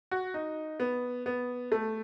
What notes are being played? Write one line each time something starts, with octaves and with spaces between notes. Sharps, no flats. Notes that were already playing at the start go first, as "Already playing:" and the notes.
F#4
D#4
B3
B3
A3